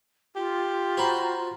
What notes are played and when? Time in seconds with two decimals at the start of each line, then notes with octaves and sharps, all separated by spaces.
0.36 F4 G4
0.97 F#4 C5 G5 A#5 B5